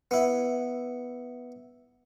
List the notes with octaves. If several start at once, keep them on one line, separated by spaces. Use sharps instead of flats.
B3 E4